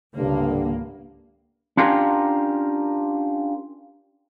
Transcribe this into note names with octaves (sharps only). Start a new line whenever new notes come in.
G#1 C#2 G2 D3 A#3
C#4 D4 F4 G4 A#4